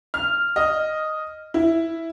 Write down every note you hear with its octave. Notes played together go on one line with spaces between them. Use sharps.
F6
D#5
E4